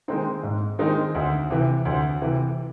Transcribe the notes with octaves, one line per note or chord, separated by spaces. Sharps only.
D#3 G#3 C4 D#4
G#2
D#3 G#3 C4 D#4
D2
C3 E3
D2
C3 E3